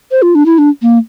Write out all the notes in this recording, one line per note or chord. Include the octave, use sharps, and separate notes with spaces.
C5
F4
D4
E4
D4
A#3